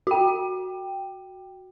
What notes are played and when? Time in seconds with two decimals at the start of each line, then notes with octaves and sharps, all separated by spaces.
0.07 F#4 G5